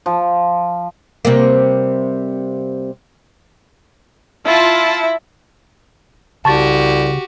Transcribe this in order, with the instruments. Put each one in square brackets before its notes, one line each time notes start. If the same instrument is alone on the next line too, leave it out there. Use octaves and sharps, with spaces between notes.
[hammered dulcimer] F3
[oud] C3 G3 A#3
[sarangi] E4 [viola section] F4 A5
[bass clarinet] C2 [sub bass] C#3 [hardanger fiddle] F#4 G4 [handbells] A5 C#6 A6